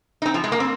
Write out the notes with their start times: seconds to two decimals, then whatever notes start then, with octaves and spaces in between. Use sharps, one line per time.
0.22 D#4
0.25 C4
0.34 F3
0.44 G#3
0.52 A#3
0.60 C4